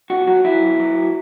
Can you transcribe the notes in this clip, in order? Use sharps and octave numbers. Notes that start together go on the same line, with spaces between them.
B1 F#4
F#3 F#4
F#3 E4
B1
F#3